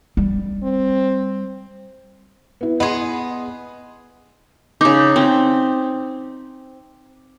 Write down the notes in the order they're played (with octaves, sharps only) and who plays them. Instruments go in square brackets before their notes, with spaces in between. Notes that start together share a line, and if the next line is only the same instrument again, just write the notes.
[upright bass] G3
[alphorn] C4
[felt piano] B3 E4
[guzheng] B3 G#4 [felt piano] D#5 C6
[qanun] C#3 D#4 [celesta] D6
[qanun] C4